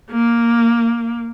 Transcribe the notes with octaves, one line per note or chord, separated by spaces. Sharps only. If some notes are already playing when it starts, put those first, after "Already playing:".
A#3